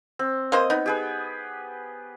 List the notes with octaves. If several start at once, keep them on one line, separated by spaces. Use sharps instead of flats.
C4
A#3 C5 D#5
B3 D#4
G4 G#4 B4